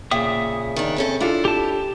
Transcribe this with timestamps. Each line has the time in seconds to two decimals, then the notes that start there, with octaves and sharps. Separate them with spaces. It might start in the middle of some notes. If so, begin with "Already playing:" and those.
0.11 A#2 C#3 E5 G5 D#6
0.76 D#3 D4
0.96 C4 C#4 A4
1.20 D4 E4 F4 A4
1.45 G4 A5